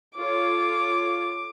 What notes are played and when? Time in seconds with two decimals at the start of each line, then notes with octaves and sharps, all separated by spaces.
0.17 F4 A4 C#5 D6